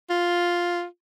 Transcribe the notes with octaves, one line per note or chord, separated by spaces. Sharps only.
F4